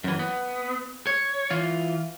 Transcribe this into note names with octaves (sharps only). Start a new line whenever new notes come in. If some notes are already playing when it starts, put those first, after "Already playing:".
F#2 E3
B3
C#5
E3 F4